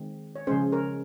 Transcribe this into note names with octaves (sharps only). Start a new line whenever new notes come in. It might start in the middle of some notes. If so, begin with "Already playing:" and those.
Already playing: D#3 G#3 C4
C#5
C#3 F3 G#3 C#4 G#4 C5
A#4 C#5